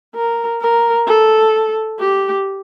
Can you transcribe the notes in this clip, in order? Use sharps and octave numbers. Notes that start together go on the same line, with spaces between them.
A#4
A#4
A4
G4